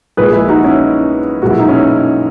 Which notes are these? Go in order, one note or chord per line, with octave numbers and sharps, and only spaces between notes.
A#1 A#2 G#3 G#4 B4
E4 G#4
D#4 F#4
C#4 E4
B1 A#2 G#3 F#4
E4
D#4
C#4 E4